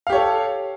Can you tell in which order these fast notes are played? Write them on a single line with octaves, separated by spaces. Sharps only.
F5 G4 C#5 A4